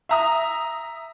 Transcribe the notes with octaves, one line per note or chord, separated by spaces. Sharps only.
E5 A#5 D#6